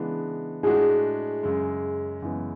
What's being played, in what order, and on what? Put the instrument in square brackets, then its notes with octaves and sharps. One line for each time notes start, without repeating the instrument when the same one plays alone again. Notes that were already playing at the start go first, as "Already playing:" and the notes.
Already playing: [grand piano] C#3 E3 G#3 B3 D4
[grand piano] A2 G#3 D4 F#4 [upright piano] G#4
[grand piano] F#2 C#3 G#3
F#2 C#3 E3 G#3 B3